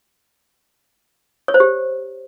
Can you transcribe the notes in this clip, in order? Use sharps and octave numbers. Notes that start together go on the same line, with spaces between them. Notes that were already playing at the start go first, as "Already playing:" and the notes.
C#5
C5
G4